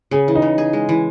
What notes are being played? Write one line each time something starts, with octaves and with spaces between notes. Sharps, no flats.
C#3 G#4
E3
D#4
C#3
G#4
G#3
E3